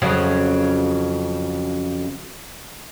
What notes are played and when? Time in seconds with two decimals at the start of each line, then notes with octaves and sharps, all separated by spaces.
0.02 F2 C#3 F#3